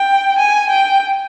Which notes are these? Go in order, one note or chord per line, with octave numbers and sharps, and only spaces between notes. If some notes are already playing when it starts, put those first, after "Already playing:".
Already playing: G5
G#5
G5